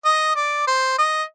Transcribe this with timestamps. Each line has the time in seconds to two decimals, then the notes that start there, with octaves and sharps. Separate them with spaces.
0.05 D#5
0.36 D5
0.67 C5
0.98 D#5